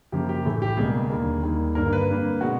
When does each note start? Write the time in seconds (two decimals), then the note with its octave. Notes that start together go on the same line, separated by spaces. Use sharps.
0.12 F#2 C#3 F3 A#3 G4
0.29 G4
0.45 A2 E3 A3
0.62 G4
0.77 C#2 B2 G3 A#3 G#4
1.10 D#2 D3 G3 A#3
1.43 D#2 D#3 G3 A#3
1.75 G2 D3 G3 A#3 A#4
1.93 B4
2.09 F2 D3 G3 A#3
2.41 B2 G#3 F#4